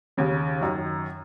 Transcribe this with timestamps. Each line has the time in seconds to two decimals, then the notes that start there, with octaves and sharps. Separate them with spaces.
0.17 D#2 C#3
0.61 F#2 D#3